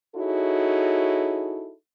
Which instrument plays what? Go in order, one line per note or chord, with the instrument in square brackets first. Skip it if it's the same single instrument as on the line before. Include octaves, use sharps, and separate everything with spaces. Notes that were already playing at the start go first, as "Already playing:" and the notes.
[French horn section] D#4 E4 F#4 G#4 A4 C#5